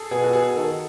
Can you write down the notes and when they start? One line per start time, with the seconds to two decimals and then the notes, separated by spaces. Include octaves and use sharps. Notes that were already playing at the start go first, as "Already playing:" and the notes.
Already playing: G#4 A4
0.11 B2 G#4
0.24 F#4
0.33 G#4
0.56 D#3 A4